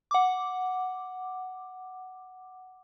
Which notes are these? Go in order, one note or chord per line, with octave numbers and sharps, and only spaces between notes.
F#5 D6